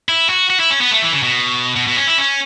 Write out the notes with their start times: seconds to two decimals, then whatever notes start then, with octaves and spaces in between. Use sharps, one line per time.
0.09 E4
0.29 F#4
0.50 F#4
0.60 E4
0.70 C#4
0.81 B3
0.91 A3
1.02 E3
1.13 C#3
1.23 B2
1.76 B2
1.87 B2
1.97 C#4
2.07 E4
2.18 C#4